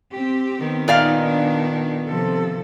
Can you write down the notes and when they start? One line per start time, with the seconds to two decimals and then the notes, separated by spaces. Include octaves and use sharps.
0.14 C4 G4
0.59 D#3 B3
0.88 A#2 D#4 D5 D#5 F5
1.25 D4
2.10 C3 F3 A4